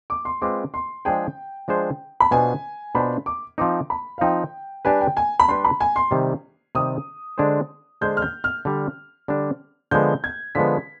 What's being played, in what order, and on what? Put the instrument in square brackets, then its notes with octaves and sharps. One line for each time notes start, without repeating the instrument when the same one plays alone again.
[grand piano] D6
C6
[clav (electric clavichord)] G#3 C4 F4 B4 [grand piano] D6
[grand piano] C6
[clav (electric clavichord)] F3 G#3 D4 G#4 C5 [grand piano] G5
[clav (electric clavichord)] F3 G#3 D4 G#4 C5
[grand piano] B5
[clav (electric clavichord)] B2 B3 D4 F4 C5 [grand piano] G#5
[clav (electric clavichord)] B2 B3 D4 F4 C5 [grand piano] B5
[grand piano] D6
[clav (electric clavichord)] F3 C4 D#4 [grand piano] D6
[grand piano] B5
F5
[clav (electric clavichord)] F3 C4 D#4 [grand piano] G5
[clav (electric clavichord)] G3 D4 G4 B4 [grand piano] G#5
[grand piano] G5
G#5
B5
[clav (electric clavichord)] G3 D4 G4 B4 [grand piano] C6
[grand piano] B5
G#5
C6
[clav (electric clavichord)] C3 D#3 G3
[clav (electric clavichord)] C3 D#3 G3 [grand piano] D#6
[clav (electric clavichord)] D3 G#3 D4 G#4 C5
[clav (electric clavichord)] D3 G#3 D4 G#4 C5 [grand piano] G6
[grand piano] F6
G6
F6
[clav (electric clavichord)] D3 G3 D4
D3 G3 D4
[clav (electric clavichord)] D3 F3 G#3 B3 [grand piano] G6
[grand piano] G#6
[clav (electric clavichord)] D3 F3 G#3 B3 [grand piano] B6